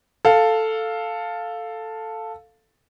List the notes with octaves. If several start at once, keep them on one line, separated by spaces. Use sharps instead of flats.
A4 F5